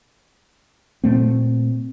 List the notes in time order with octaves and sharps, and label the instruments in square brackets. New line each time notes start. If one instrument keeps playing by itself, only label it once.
[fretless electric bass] A#2 A3 C4